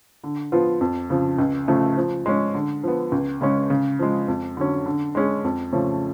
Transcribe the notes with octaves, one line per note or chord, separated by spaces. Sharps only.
D3
F3 B3 F4
F2
C#3 F3
C#2
C#3 F3 A3
F3
G#3 C#4
D3
F3 B3
C#2
C#3 G#3 C#4
C#3
F3 G#3
F2
D3 F#3 C#4
D3
G#3 C#4 G#4
F2
C#3 F3 A3 C#4